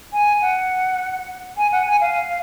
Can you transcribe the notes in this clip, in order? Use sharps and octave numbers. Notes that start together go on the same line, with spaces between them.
G#5
F#5
G#5
F#5
G#5
F5